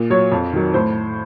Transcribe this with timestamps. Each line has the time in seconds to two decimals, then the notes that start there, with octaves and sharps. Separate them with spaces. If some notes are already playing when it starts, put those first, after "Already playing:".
Already playing: A#2
0.10 F#3 C#5
0.32 F2
0.53 D#3 F#3
0.74 A2 C5